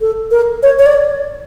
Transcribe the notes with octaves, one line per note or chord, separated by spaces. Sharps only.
A4
A#4
C#5
C#5
D5